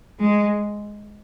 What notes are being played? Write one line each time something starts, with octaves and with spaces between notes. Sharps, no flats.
G#3